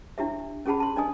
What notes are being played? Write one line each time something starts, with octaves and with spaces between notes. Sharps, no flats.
D4 E4 G4 E5
C#4 G4 G#4 F#5 A5 B5
A5 C6
D4 D5 D#5 G#5 D#6